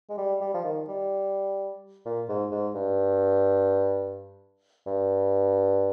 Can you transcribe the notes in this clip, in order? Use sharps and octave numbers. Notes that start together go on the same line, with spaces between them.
G#3
G3
G3
F3
D#3
G3
A#2
G#2
G#2
G2
G2